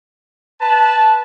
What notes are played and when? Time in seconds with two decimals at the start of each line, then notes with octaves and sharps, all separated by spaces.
0.60 B4 A5